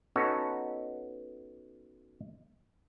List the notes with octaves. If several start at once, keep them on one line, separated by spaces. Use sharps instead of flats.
B3 C#4 D#4 F#4 A4 C#5